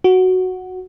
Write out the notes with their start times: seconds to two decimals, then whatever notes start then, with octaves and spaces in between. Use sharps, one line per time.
0.04 F#4